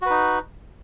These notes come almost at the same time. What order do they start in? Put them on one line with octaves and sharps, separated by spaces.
F#4 B4 D#4